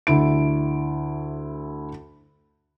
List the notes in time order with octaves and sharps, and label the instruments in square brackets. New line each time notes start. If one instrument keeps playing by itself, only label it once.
[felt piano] D2 E4 D7